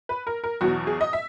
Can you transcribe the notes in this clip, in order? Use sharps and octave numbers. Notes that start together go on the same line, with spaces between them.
B4
A#4
A#4
E2 B2 F#3 F#4
G#4
D#5
E5